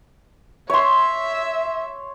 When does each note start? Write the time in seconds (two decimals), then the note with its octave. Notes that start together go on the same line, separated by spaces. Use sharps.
0.70 C#5 E5 C6